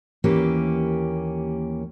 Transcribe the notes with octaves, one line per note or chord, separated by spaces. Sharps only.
D#2 E3 A#3 C#4 G4